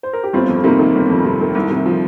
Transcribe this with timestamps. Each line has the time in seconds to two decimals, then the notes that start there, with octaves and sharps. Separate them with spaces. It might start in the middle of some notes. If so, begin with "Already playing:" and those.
0.03 C5
0.13 A#4
0.23 G4
0.33 G1 C4 F4
0.49 F2
0.64 C3 A#3 D#4
0.79 D#3
0.95 G1
1.10 F2
1.25 C3
1.40 D#3
1.55 C2
1.71 C3
1.86 F3